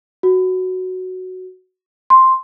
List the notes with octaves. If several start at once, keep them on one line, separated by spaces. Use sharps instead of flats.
F#4
C6